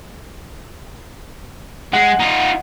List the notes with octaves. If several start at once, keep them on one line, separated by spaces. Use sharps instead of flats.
G#3 F#5
D#4 F4